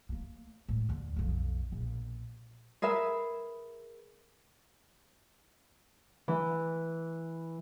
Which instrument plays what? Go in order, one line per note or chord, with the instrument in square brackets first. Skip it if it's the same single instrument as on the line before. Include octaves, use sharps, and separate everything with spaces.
[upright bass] A3 A#3
A2 G#3
D#2 D3
B1 F2
A#1 B2
[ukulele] G#4 A#4 B4 E5
[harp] E3